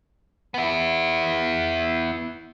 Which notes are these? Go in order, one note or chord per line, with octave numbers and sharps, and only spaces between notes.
B3 E4